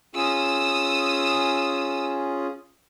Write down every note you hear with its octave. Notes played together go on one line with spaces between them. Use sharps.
C#4 F4 G#4 D#6 E6